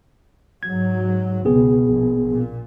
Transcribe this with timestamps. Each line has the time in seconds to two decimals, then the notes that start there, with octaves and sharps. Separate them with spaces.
0.63 G#2 F#3 G#6
1.45 C#2 B2 B3 C4 G#4
1.84 A#1
2.30 A#2